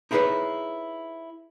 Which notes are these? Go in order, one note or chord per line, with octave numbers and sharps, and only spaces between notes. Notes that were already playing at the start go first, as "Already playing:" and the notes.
D#4 E4 G#4 A#4 B4 C#5